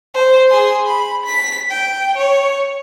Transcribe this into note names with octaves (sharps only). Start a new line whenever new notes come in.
C5
G#4 C6
B5
B6
G5
C#5